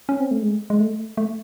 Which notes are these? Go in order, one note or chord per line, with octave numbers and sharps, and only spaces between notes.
C#4
C4
A3
G#3
G#3
A3
A3